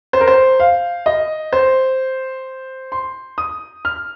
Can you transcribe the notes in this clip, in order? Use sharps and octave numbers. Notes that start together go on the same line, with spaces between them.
C5
A#4
C5
F5
D#5
C5
C6
D#6
F6